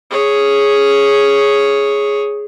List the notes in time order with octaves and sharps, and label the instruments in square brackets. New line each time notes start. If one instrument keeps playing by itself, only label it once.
[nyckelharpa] G#4 C#5